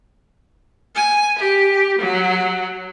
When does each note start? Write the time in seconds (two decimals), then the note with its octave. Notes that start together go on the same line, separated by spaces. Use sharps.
0.95 G#5
1.39 G4
1.99 F#3